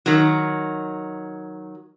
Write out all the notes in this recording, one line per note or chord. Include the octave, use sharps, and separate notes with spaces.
D#3 F#3